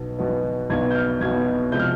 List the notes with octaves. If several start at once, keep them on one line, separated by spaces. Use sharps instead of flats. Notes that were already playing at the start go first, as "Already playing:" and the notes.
Already playing: B1 B2 B3
B1 B2 B3
B1 B2 B3 G#6
G6
F6
B1 B2 B3 G#6
C3 F3 G#3 G6
F6